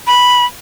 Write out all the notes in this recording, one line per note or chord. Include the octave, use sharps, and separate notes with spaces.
B5